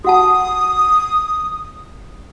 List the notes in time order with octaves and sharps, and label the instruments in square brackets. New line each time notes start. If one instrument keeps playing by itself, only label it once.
[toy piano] F#4 F#5 A5 [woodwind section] D#6